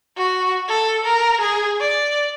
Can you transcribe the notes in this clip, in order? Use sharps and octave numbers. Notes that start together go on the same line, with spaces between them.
F#4
A4
A#4
G#4
D5